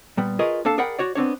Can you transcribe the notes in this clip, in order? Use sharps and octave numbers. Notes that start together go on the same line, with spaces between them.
A#2 G3 B3
F4 G#4 A#4 B4 C#5 D#5
A#3 D4 A4 F5 A5
G#4 A#4 D5 F#5 G5 B5
F#4 C#5 D5
B3 C4 D4 C#5